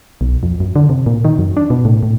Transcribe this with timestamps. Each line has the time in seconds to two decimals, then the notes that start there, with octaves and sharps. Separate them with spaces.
0.21 B1
0.43 F2
0.60 F#2
0.76 D3
0.89 C3
1.06 A#2
1.25 D#3
1.39 F#2
1.57 D4
1.70 B2
1.85 A2
2.03 A2